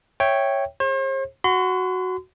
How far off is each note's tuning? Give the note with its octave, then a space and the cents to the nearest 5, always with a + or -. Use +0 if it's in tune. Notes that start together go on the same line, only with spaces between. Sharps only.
C#5 -5 E5 +0 G5 +0
G#4 -25 C5 +45
F#4 +0 C6 -40